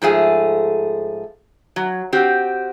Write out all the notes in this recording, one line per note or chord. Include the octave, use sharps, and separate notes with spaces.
G#2 F3 A3 G#4
F#3
C4 F#4 G4